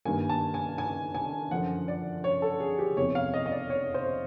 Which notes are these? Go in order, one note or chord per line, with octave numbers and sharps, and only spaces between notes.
G2 D#3 G3 A#3 G#5
A5
G#5
G#5
G#5
F#2 D3 F3 F#5
D5
C#5
A4
G#4
G4
F1 E2 C3 C#5
F5
D#5
D#5
D5
C#5
C5